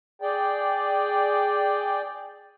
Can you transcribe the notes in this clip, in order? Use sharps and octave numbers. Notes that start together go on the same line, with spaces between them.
G#4 D5 G5